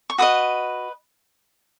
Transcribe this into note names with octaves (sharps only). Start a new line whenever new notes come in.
C#6
F#4 B4 D#5 D#6